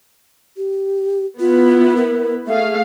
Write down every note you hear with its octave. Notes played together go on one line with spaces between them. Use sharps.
G4
B3 E4 F4 B4
A#4
A3 G#4 E5 F5